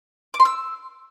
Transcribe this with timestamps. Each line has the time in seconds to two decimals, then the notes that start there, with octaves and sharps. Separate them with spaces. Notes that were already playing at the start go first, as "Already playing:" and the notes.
0.34 D6
0.40 C6
0.45 E6